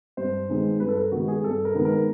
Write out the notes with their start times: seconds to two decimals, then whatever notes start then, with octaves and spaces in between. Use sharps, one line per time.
0.17 G2 C5
0.49 D#3 G#3 B3 D#4
0.80 G2 B4
0.88 A4
0.97 A#4
1.12 D#3 G#3 B3 D#4 F#4
1.28 G#4
1.43 G2 A4
1.65 A#4
1.75 D#3 G#3 B3 D#4
1.85 A#4